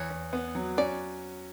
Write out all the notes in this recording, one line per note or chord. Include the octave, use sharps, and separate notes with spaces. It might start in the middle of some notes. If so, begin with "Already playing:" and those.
Already playing: E2 C#5
E2
B3
F#3
C#4 D5